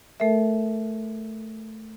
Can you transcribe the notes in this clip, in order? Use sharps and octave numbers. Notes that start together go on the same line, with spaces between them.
A3 A4 A#4 E5